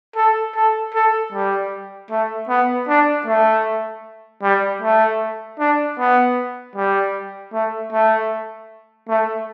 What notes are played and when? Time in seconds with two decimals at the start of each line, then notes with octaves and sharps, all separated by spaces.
0.16 A4
0.55 A4
0.94 A4
1.32 G3
2.10 A3
2.49 B3
2.88 D4
3.26 A3
4.43 G3
4.82 A3
5.59 D4
5.98 B3
6.76 G3
7.53 A3
7.92 A3
9.08 A3